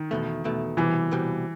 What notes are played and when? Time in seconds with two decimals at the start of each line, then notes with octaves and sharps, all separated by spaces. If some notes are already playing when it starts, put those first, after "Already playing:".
Already playing: D#3
0.11 E2 B2 A3
0.44 E2 B2 A3
0.77 C2 B2 E3 G3
1.11 C2 B2 G3